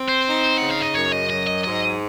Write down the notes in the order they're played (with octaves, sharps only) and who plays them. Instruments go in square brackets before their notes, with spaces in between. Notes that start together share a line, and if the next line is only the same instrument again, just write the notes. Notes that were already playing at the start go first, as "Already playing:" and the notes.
Already playing: [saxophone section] C4
[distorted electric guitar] C5
[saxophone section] D#4
[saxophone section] C#3 [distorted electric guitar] F#5
[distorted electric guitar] F5
D#5
[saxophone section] F#2 [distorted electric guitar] C#5
[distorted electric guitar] D#5
[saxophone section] F#3 [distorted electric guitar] D#5
[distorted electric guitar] D#5
[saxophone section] G#2 [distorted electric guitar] D#5